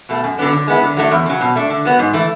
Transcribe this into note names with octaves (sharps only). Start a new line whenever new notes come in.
B2 A3
F#2
D3 F#3 B3 D4
D3
G#3 B3 E4
D3
F#3 A3 D4
E2
C#3 F#3
B2
A3 D4
D3
F#3 B3
G#2
E3 A3